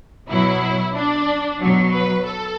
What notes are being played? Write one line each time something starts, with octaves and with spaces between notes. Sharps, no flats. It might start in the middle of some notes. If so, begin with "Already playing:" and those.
B2 F#3 E4
D4
B2 F#3
B4
A4